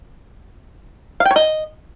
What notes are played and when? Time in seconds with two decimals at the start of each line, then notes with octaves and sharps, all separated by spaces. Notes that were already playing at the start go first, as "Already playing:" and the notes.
1.20 F5
1.25 G5
1.31 C#5
1.36 D#5